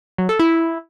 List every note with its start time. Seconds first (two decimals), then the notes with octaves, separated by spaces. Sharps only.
0.18 F#3
0.29 A4
0.39 E4